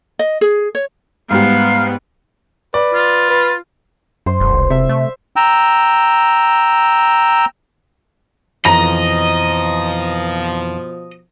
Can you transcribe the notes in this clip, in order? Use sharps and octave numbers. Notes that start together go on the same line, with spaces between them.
D#5
G#4
C#5
G#2 G3 B3 F5
B4 D5
F4
B4
F#2 C5
E1
C2
C3 E5
A3
G5 A#5 E6
F2 B2 E3 F3 D#5 A#5